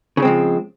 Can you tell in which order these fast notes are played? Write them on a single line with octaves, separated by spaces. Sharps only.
C#3 D#4 C4 G#3 F3